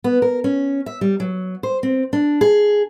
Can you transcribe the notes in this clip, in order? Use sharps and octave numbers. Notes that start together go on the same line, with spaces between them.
B3
A#4
C#4
E5
G3
F#3
C5
C4
D4
G#4